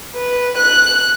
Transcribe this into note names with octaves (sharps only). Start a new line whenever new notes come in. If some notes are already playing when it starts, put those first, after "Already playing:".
B4
F#6